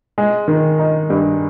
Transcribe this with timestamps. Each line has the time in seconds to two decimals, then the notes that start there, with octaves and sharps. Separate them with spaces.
0.18 G#3
0.48 D#3
0.79 D#4
1.10 G2